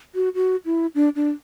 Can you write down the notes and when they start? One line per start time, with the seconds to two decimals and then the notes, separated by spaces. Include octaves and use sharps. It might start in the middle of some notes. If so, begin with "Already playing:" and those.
0.15 F#4
0.35 F#4
0.65 E4
0.95 D4
1.16 D4